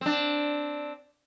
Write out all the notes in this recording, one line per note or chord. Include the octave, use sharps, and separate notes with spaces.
C4 D4